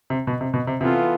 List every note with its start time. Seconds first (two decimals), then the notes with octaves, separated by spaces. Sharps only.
0.10 C3
0.27 B2
0.41 C3
0.54 B2
0.67 C3
0.80 C3 E3 B3 F4 A4